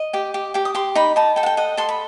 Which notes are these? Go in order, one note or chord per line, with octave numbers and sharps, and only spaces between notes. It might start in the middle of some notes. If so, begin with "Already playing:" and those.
Already playing: D#5
G4 G5
G4
G4 G5
D#6
G4 C6
D#4 B5
D#4 A5
A4 G5
F#5
G5
D#5 F#5
A4 C6
B5